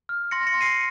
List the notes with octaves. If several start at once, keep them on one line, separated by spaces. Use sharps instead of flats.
F6
C6 A#6 C#7
A#6 C#7
C6
C7 D#7